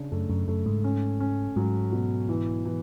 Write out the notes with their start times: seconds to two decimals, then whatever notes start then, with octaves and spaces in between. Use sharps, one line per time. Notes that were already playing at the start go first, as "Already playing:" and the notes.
Already playing: C#3 D4
0.12 F#2 A3
0.30 F#2
0.48 F#2 A3
0.66 G#2
0.84 C#4
1.20 C#4
1.56 G#2 F#3
1.92 B2
2.29 E3
2.65 E3